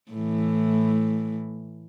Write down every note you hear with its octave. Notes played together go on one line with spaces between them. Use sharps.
A2 E3